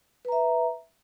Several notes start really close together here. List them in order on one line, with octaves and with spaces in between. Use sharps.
B4 A#5 E5